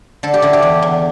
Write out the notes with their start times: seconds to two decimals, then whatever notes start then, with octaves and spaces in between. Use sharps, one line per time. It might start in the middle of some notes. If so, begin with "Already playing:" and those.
0.23 D3 A4
0.34 G4
0.42 D3 E4
0.53 G4
0.62 E2
0.82 E2